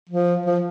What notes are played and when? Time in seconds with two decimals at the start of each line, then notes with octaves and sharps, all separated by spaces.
0.09 F3
0.46 F3